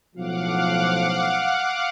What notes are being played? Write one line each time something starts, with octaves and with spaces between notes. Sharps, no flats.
B1 A2 F3 F5 F#5 D6